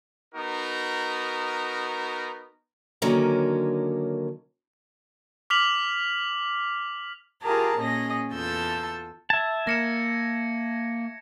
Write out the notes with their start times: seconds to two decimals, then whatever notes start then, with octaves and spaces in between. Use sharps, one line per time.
0.35 B3 D#4 F#4 A#4
3.02 D3 D#3 F#3 A#3 C#4
5.50 D6 F6 B6 F7 F#7
7.41 F4 G4 G#4 A#4 A5 A#5
7.79 A#2 C#4 G#4 D#5 A#6
8.32 E2 F4 A4 A5 E6 G6
9.30 E5 A5 G#6
9.67 A#3 A#6 C#7 E7